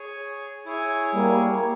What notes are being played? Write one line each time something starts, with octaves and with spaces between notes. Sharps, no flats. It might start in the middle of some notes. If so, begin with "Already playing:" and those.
Already playing: G#4 C#5 G#5
E4 G#4 C#5 G#5
G3 A#3